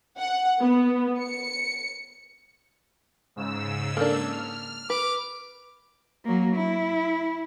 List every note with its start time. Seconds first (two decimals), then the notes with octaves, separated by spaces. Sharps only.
0.18 F#5
0.60 B3
1.19 C#7
3.36 G#2 C#3 E6
3.97 A#3 D4 A4 A#4
4.32 F6
4.90 B4 D6
6.25 F#3 A#3
6.57 E4